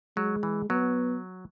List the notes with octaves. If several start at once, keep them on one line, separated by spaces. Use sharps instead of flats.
F#3 G#3
E3
F#3 B3